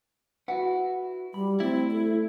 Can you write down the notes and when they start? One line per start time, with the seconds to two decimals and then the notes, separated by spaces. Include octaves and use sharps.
0.48 E4 F#4 B4 F#5
1.34 G3 B5
1.60 A3 C4 E4 D5
1.91 A4